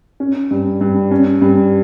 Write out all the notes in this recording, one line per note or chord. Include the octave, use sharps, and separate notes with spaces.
C#4
G2
G2
C#4
G2